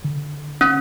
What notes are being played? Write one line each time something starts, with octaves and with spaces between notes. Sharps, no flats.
D3
C#4